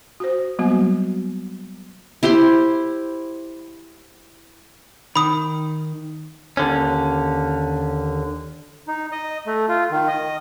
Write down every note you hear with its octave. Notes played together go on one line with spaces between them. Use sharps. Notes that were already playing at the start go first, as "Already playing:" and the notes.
F#4 C5
F#3 G3 A#3 B3 F#4
E4 G4 C5 C6
D#3 B5 D#6
D#2 D3 C#4
D#4
D#5
A3
F4
D#3
D#5